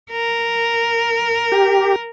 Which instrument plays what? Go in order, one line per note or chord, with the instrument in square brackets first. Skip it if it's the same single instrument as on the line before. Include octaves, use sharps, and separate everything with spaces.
[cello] A#4
[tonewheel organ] G4